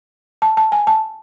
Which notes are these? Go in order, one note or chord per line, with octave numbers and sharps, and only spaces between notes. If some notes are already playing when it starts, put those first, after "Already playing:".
A5
A5
G#5
A5